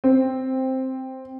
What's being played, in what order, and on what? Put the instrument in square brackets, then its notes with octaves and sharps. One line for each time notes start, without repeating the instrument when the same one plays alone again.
[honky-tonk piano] C4